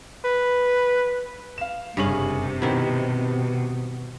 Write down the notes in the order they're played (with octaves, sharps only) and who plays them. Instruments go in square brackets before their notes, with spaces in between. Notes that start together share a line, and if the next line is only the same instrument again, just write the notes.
[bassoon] B4
[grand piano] F5 E7
[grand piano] F#1 G#4 F#7 [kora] G2 C#4 F5 [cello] C3
[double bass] B2 [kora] D#3 E4 [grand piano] B3 C4 G4